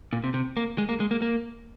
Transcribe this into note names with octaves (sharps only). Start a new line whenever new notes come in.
A#2
C3
C3
A#3
G#3
A#3
G#3
A#3
A#3